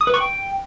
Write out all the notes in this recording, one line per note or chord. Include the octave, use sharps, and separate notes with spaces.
D#6
B4
C#6
G5